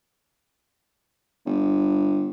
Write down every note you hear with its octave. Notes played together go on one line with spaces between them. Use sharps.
G1